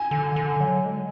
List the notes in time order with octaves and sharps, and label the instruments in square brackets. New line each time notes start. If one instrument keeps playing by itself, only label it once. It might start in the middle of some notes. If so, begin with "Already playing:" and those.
Already playing: [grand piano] G#5
[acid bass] D3
D3
F#3
G#3